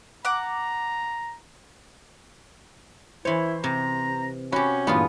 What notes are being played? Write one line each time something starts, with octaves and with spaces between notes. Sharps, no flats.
F#5 A#5 D6
E3 E4 C5 C#5
C3 A#5
C#4 F#4 G4 G#5 B5
G2 A#2 E3 B3 F4 G#4